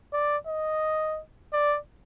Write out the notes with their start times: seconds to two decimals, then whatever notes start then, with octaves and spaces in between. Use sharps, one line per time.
0.13 D5
0.47 D#5
1.53 D5